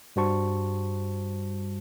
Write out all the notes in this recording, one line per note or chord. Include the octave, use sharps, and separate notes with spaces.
G2 G3 F#4 C5 A5 C#6